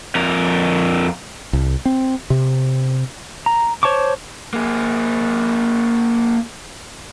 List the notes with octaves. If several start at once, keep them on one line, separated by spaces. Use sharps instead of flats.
F2 A#4
C2
C4
C3
A#5
C5 C#5 A5 C#6 D6
A#3 G#4